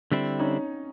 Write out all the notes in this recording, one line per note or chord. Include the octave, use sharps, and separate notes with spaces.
D3 G3 C4 E4
C#4 D#4